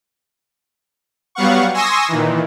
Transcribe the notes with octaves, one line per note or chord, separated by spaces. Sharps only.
F#3 G3 B3 F5 F#5 C#6
G#5 C6 C#6 D#6 E6 A#6
A#2 D#3 E3